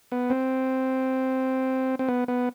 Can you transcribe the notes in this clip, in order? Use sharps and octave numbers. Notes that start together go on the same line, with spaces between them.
B3
C4
C4
B3
B3